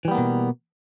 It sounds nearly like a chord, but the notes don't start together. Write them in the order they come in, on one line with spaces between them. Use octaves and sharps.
E3 G3 B3 A#3 B2